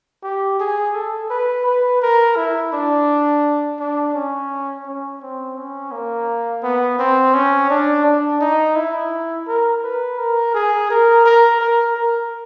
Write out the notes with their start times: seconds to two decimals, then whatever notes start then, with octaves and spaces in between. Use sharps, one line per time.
0.23 G4
0.60 G#4
0.95 A4
1.30 B4
1.66 B4
2.02 A#4
2.36 E4
2.73 D4
3.80 D4
4.14 C#4
4.86 C#4
5.22 C4
5.57 C#4
5.92 A#3
6.63 B3
6.99 C4
7.34 C#4
7.70 D4
8.05 D4
8.41 D#4
8.76 E4
9.48 A#4
9.84 B4
10.19 A#4
10.55 G#4
10.90 A#4
11.25 A#4
11.61 A#4
11.96 A#4